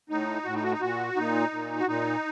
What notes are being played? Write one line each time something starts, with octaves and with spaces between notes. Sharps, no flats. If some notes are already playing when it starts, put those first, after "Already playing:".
A2 D#4
A2 F#4
D#4
F#4
D#4
A#2 F#4
A#2 D#4
A#2
F#4
A#2 D#4